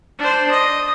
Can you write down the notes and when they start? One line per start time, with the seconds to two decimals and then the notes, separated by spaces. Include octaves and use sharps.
0.19 D4 C5
0.51 D#5